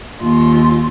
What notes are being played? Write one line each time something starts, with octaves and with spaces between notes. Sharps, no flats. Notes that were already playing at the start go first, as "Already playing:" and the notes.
D#2 F4